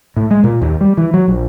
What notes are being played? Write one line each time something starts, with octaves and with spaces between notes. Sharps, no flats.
A2
G#3
A#2
D#2
G3
E3
F#3
A#1